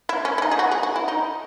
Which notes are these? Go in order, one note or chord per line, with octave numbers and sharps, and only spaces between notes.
E4
C#4
E4
D#4
G#4
F#4
G#4
F#4
E4
D#4